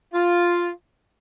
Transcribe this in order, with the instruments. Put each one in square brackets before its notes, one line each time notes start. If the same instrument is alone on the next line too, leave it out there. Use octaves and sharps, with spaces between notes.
[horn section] F4